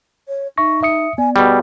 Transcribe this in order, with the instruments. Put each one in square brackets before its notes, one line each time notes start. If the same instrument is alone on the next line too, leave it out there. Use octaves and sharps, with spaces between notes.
[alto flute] C#5
[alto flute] D#4 [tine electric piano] E5 C#6 A#6
[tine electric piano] E5 D#6 C#7
[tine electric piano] B3 D5 [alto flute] G#5
[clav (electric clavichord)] B2 G3 [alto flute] G#4